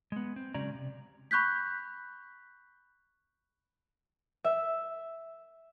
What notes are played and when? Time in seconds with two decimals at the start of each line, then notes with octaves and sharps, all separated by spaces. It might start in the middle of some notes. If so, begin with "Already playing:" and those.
0.12 G#3 B3
0.36 C4
0.54 C#3 F#3 G#3 C#4 D5 A#5
0.75 C3
1.31 B5 C#6 F#6 G6 B6
4.44 E5